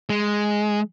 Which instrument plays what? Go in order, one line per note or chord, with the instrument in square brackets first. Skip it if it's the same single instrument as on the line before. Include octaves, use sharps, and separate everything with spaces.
[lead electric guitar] G#3